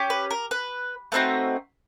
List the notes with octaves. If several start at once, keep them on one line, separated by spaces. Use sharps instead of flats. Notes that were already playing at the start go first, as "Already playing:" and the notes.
Already playing: C#4 G4
B4
A#4
B4
A3 C4 D#4 F#4 B4